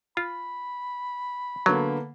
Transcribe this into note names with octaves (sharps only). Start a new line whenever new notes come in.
F4 B5
D3 F#3 A#3 B3